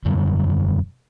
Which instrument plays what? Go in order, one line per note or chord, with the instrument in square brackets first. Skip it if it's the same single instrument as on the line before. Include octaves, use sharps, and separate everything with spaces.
[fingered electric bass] E1 F#2 D3 G3